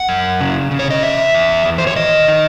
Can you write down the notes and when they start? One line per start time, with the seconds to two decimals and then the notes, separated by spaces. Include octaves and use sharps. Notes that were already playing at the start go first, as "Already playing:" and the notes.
Already playing: F#5
0.09 F#2
0.41 C#3
0.71 C#3
0.79 C#5
0.90 D#5
1.03 E2 E5
1.34 E2
1.65 E2
1.78 C5
1.87 C#5
1.96 D#3 D#5
2.28 D#3